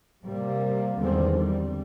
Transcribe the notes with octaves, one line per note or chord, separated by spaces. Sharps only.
C3 G3 A#3
E2 D3 D#3 G3 G#3 C4
G3